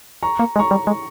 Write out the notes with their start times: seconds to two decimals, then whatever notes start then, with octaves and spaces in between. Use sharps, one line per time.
0.23 A#5 C#6
0.39 A#3
0.56 G#3
0.59 A#5 C#6
0.71 G3
0.87 G#3